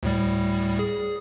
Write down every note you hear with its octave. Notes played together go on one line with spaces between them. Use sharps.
D2 A2 G3
G#4